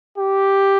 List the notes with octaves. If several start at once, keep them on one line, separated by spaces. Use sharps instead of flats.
G4